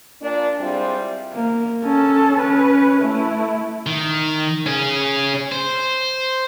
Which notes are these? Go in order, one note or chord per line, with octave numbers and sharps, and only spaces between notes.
A#2 D4
G3 G#3 C4 E4 F4
A#3
C#4 A4
C#4 B4
A3 E4
D#3
C#4 G#4
C5